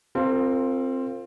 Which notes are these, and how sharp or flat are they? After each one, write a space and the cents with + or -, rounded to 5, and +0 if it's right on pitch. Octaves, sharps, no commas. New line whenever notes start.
C4 +10 F4 +0 A#4 -40